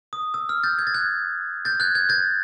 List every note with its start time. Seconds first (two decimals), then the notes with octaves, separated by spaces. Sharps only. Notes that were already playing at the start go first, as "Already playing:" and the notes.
0.13 D#6
0.34 E6
0.49 F6
0.63 G6 A6
0.79 G#6
0.87 A6
0.94 F#6 G#6
1.65 G6 A6
1.80 F#6 G#6
1.95 F#6 G#6
2.09 G6 A6